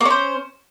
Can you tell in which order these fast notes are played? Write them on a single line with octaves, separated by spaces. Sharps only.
A#3 C#4 C5